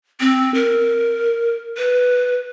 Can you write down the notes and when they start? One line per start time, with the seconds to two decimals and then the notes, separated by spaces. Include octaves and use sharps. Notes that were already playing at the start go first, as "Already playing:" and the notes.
0.20 C4
0.54 A#4
1.77 B4